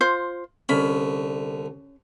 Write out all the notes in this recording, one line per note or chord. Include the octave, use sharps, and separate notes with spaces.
F4 C5
C2 D3 C#4 B5